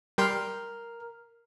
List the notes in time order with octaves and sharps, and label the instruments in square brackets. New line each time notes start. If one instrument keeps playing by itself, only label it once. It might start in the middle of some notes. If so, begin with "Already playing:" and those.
[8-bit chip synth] G3 G5 C6 [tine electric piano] A#4 F6